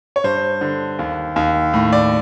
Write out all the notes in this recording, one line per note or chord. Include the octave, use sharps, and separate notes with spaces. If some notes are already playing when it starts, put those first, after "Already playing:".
C#5
G2 C5
D3
D#2
D#2
A2
D5